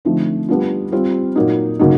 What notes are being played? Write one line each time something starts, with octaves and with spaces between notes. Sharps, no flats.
D3 F3 A3 C4 D#4
G3 B3 D4 F4
G3 C4 F4
A#2 F#3 A#3 D#4
C#3 F#3 A#3 D#4